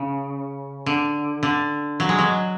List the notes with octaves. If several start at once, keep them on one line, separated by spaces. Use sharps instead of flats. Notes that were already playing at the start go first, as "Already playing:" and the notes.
Already playing: C#3
D3
D3
F#3
G#3
F#3